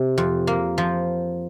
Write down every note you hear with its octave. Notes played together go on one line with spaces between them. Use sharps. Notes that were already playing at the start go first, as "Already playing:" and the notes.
Already playing: C3
F2
A#3
F3